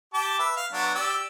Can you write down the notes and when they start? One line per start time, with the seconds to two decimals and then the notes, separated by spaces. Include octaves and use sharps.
0.14 G4 A5 D6
0.39 B4 E5
0.56 F5
0.72 F#3 B3 D4
0.95 G4 D5 E6